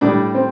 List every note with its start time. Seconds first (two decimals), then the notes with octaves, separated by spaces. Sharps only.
0.01 A2 G3 D4
0.34 C4